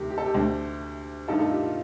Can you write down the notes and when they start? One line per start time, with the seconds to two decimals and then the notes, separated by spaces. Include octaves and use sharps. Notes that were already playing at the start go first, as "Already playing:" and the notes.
Already playing: D2 C3 D#3 A3 G4
0.10 G4
0.18 A4
0.26 G4
0.34 D2 D3 A3
1.28 G2 D#3 A3 D#4 F4 A4
1.39 F4 A4
1.52 G4
1.63 F4